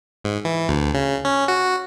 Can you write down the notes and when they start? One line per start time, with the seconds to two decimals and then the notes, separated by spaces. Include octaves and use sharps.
0.24 G#2
0.45 E3
0.69 D2
0.94 C#3
1.25 C#4
1.48 F#4